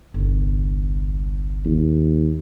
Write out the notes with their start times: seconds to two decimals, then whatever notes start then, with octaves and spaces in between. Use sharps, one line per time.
0.14 G1 C2
1.65 D#2